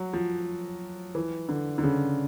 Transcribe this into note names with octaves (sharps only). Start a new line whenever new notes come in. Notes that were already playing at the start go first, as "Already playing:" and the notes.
Already playing: F#3
F3
E3
D3
D3
C#3